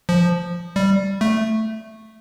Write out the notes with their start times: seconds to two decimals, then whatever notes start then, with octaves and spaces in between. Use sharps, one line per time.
0.09 F3
0.76 G3
1.21 A3